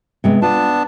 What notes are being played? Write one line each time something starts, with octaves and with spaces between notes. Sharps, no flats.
C3 G#3 B3
B3 D4 F4 A5